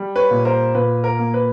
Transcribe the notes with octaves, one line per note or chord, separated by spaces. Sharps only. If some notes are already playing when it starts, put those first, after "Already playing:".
Already playing: G3
B4 C#5
A#2
A#4 C5
A#2 B4
A#4
A#3
B4